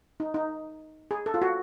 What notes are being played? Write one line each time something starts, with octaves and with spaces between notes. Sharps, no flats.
D#4
D#4
G#4
A4
F4
F#4